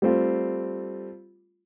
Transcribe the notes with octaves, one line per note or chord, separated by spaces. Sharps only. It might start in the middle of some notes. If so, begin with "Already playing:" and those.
G3 A3 C4 F4